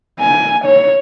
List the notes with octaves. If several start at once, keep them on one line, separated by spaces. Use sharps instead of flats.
G#5
C#5